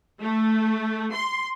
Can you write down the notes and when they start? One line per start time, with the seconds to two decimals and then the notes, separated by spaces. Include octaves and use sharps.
0.21 A3
1.13 C6